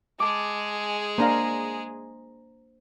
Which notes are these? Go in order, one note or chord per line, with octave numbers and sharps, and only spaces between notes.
G#3 G#4 A5 D6
A#3 D4 C5 F5 A#5